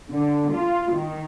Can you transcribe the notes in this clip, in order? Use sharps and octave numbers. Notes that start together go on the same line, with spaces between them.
D3
F4
D#3